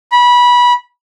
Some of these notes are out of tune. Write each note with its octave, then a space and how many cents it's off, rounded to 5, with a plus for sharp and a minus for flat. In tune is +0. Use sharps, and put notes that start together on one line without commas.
B5 -20